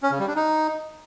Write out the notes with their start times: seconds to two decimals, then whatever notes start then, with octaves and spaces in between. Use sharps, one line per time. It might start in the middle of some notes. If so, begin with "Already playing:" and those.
0.03 C#4
0.11 C#3
0.19 G3
0.27 D4
0.36 D#4